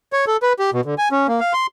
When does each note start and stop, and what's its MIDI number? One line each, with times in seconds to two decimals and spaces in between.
0.13 0.25 73
0.27 0.37 69
0.43 0.53 71
0.59 0.70 67
0.73 0.81 47
0.85 0.95 50
0.98 1.09 80
1.12 1.27 61
1.28 1.40 58
1.40 1.53 77
1.53 1.67 84